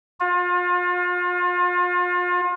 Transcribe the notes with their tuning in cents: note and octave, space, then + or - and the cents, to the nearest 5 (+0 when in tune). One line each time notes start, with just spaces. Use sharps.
F4 +35